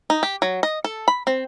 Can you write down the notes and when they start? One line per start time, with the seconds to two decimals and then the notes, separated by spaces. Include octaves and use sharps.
0.10 D#4
0.23 G4
0.42 F#3
0.63 D#5
0.84 A4
1.08 B5
1.27 C4